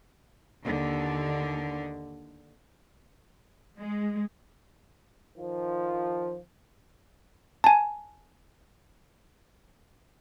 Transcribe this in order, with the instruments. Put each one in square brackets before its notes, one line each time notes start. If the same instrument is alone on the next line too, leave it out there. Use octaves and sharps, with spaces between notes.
[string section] D#2 D3
[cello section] G#3
[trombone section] D#3 F3
[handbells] G#5 A5